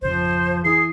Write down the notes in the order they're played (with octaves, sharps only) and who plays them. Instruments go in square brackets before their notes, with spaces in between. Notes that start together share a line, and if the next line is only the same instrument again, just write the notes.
[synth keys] G#1 F2 C#3 [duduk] F3 [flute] C5
[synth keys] E3 E4 D#6 [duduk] G#4 [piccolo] C7